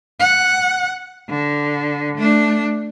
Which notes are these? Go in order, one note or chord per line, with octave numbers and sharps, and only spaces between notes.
F#5
D3
A3 D4